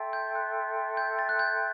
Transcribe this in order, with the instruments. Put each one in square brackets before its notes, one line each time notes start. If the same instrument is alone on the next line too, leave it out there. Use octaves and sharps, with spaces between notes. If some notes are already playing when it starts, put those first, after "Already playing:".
Already playing: [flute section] A4 E5 G5 C6
[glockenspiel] G6
F#6
G6
A6
F#6
G6